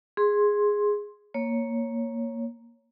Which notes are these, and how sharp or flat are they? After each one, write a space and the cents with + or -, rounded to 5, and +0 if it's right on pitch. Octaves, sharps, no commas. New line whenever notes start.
G#4 -5 C6 +10
A#3 +0 C#5 +0